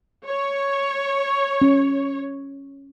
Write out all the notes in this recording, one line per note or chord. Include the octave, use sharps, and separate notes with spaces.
C#5
C#4